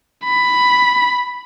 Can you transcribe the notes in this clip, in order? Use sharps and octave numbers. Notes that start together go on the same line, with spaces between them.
B5